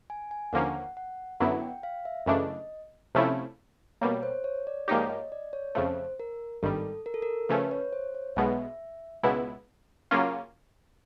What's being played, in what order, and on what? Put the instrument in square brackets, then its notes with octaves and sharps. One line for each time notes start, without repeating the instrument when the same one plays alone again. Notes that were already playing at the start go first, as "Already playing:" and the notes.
[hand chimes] G#5
G#5
[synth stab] D#2 D3 F3 A#3 C#4 [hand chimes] F#5
[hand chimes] F#5
[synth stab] F#2 D3 F#3 B3 E4 [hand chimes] F#5
[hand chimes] G5
F5
E5
[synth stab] F#2 C#3 E3 A3 D4 [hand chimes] D#5
[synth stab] C3 F3 A3 C#4 E4
[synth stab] B2 G3 A#3 [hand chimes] C#5
[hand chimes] C5
C#5
D5
[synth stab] G#2 F3 A#3 D#4 G4 [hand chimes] C#5
[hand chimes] D#5
D5
C#5
[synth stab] F2 C#3 F3 A3 [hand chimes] C5
[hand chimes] A#4
[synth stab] G#1 G2 D#3 G3 [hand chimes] A4
[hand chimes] A#4
A4
A#4
[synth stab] C#3 F3 A3 C#4 [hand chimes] B4
[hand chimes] C#5
C5
C#5
[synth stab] B1 B2 G#3 B3 [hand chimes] E5
[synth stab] C#2 B2 G#3 B3 E4
C#3 F#3 A#3 C#4 F4